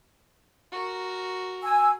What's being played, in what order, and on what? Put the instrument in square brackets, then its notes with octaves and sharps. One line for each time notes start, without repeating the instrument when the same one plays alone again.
[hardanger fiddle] F#4 A#4
[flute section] G#5 E6